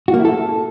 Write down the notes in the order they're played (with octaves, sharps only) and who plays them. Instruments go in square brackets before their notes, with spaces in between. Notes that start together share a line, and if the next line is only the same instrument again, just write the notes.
[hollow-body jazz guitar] F#4
A#3
E4
A4